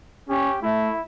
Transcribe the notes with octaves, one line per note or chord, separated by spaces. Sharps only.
C#4 G4
A3 E4